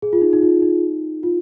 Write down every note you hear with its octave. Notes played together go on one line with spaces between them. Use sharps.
G#4
F4
D#4
D#4
F4
D#4
F4